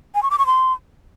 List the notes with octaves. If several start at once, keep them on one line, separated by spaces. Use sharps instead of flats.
G#5
C#6
D6
C#6
C6